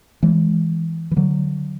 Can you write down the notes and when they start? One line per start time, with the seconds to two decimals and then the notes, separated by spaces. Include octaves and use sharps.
0.23 E3 G#3
1.11 E3
1.17 D3 F#3